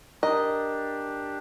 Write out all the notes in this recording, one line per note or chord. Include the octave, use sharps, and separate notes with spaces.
D4 G4 A#4 D#5 A#5